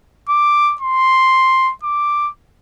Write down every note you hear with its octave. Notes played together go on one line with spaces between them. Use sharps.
D6
C6
D6